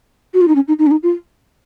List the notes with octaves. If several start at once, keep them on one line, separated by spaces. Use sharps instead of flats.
F#4
F4
D#4
C#4
D#4
D#4
C#4
D#4
F4